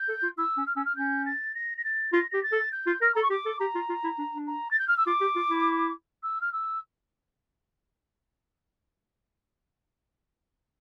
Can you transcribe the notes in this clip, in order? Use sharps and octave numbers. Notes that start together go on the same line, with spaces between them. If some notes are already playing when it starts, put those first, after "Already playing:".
Already playing: G6
A4
F4
E4 E6
C#4
F6
C#4 E6
F6
C#4 G6
A6
A#6
A#6
A6
F4 A#6
G4 A#6
A6
A4
G6
F4
A#4 F6
A4 A#5
C#6
G4 D6
A4
G4 A#5
F4
F4
E4
D4
D4
A#5
A6
G6
F6
E6
F4 D6
G4
F4
E4
E6
F6
E6